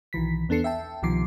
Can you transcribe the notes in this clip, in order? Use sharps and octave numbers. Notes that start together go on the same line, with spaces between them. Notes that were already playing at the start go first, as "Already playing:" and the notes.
B1 D#3 E3 B6
E2 B3 D4 A4 C7 C#7
E5 G5 A5
C2 B2 D#3 F3 D6 C7